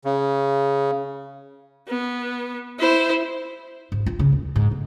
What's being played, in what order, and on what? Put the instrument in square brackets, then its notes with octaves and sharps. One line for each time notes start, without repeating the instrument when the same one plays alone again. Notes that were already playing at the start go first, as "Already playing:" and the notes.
[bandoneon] C#3
[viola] B3
E4 C5
[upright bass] G#2
F4
C#3
D#2
G#2
G1